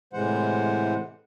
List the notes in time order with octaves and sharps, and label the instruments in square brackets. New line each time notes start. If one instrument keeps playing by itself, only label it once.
[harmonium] A2 C3 E3 G#3 C5 F#5